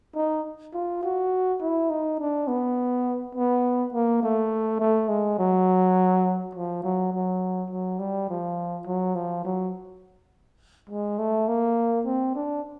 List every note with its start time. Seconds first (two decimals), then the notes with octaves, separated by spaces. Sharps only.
0.15 D#4
0.73 F4
1.04 F#4
1.62 E4
1.90 D#4
2.20 D4
2.47 B3
3.35 B3
3.93 A#3
4.23 A3
4.80 A3
5.09 G#3
5.39 F#3
6.55 F3
6.84 F#3
7.13 F#3
7.70 F#3
7.99 G3
8.29 F3
8.87 F#3
9.15 F3
9.45 F#3
10.89 G#3
11.19 A3
11.48 A#3
12.05 C4
12.35 D4